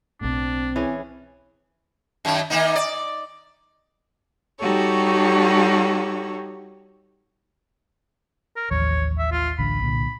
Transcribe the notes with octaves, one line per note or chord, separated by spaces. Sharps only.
B1 A2 C4 D4
E3 C#4 G#4
F#2 D#3
D#3 A#3 D#4
D5
G3 D#4 F#4 G4 A4 C#5
A#4
A1 D#2 F3 C#5
E5
F4
A1 D2 D3 B5
C2 A#2 D3